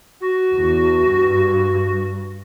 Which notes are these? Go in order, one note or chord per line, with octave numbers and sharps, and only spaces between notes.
F#4
E2
G2